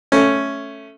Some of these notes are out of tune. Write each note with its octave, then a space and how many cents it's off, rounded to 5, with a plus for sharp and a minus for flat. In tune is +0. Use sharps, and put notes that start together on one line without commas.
A3 +0 C#4 +0